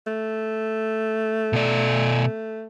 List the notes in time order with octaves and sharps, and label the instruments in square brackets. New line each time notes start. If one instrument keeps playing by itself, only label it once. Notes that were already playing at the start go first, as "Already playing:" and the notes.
[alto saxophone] A3
[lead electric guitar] B2 D5